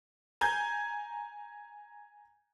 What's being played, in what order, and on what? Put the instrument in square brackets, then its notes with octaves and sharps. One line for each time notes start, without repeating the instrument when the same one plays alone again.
[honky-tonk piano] G#5 A#5 G6 G#6